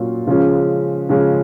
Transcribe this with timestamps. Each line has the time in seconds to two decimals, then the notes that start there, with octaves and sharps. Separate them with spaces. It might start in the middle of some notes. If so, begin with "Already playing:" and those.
Already playing: A#2 F#3 C#4 F4
0.27 C#3 F3 G#3 C#4
1.09 C#3 F3 G#3 C#4